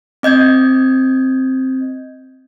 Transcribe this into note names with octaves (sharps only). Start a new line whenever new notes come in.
C4 D#5 G6 G#6